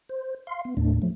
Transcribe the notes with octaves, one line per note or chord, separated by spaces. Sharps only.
C5
F5 C6
B3
D#2 A2 A3 D4
F3 F#3 A3